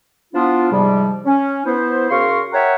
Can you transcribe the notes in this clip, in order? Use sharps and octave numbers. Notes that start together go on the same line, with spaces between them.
F3 B3 D4 E4 F4
G#2 C3 F3 G3
C#4
B3 E4 C5
C#3 F#4 A#4 F5 C6 C#6
A#4 C#5 E5 F#5 G5